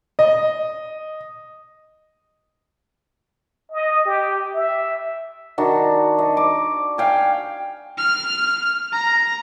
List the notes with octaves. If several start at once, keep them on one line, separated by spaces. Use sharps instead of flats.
D#5
D#5
G4
E5
D#3 D4 F#4
D#5
D6
F5 G5 G#5
F6
A#5